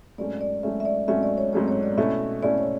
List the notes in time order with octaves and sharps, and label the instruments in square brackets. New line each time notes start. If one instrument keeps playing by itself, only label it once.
[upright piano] G#2 F#3 A3 C#4 [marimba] D5
[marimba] D5
[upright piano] G#2 F#3 A3 C#4 [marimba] E5
[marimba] E5
D5
[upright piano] G#2 F#3 A3 C#4 [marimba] E5
[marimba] D5
C#5
[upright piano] G#2 F#3 A3 C#4 [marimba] C#5
[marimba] C#5
D5
[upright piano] B2 A3 C#4 E4 [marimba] E5
[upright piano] B2 A3 C#4 E4 [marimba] D5
[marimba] C#5